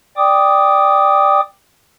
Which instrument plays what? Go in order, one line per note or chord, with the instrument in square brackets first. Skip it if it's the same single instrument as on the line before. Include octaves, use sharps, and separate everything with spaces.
[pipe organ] D5 G5 D6 D#6